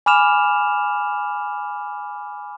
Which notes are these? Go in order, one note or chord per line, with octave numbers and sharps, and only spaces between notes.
G#5 B5 D6 F6 E7 F7